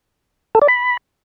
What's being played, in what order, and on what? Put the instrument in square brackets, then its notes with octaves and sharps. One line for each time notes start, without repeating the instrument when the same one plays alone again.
[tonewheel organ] A4
D5
B5